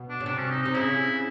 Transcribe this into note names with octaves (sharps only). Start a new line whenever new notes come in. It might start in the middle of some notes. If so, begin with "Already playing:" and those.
Already playing: B2
D4
C#3
C3 D4
C#4
D#4
C3 D#4
C#3 E4